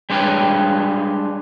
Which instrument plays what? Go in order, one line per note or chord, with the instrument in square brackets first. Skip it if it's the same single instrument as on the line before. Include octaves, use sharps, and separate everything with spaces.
[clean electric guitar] G3 G#3 D4 B4 C#5 G5